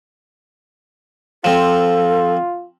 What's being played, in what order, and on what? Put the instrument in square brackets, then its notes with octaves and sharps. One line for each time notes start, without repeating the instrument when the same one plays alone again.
[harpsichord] F3 C4 [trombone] F4 [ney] A4